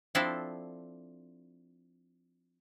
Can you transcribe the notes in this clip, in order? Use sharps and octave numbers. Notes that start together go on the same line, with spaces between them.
F3 C4 D4 E4 A4 C5